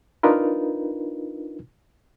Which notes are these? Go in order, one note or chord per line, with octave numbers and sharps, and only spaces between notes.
D4 D#4 F4 A#4 B4